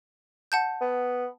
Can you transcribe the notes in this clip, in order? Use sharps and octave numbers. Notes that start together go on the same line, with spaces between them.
F#5 A5 G6
B3